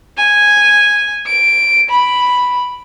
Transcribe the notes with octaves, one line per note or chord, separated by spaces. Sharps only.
G#5
D7
B5